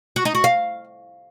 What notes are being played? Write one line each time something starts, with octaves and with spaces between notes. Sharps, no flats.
F#4
D#4
F#4
F5